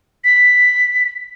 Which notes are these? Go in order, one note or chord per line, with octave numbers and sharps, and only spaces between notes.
B6